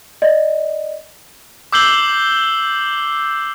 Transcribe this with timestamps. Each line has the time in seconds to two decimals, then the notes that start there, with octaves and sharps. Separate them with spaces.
0.22 D5 D#5
1.73 D6 E6 G6 C7 F#7 G7